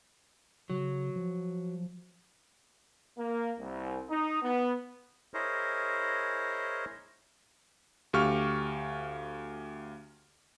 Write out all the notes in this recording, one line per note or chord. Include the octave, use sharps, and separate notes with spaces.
C#3 F#3
F3
A#3
C2
D#4
B3
E4 G#4 A#4 C5 C#5 D#5
D2 G4 F5 C#6 F6